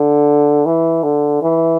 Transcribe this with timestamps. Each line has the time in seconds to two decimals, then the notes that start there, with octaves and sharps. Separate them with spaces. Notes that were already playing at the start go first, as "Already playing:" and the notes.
Already playing: D3
0.66 E3
1.03 D3
1.42 E3